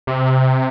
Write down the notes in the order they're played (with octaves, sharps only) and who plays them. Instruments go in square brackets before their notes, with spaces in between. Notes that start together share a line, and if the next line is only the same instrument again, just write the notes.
[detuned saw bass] C3